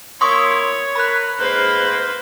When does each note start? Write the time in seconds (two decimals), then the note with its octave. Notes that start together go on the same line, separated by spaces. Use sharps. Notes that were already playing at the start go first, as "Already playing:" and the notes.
0.21 A#3 E4 C#5 C6 C#6 D#6
0.96 A#4 B4 B5 F#6
1.40 G#2 A#3 B4 C5